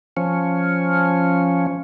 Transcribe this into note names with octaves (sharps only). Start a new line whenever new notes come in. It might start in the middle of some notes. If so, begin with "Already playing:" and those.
F3 C#4